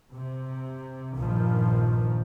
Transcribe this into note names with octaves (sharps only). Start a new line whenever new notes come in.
C3
A#1 G2 D#3 F3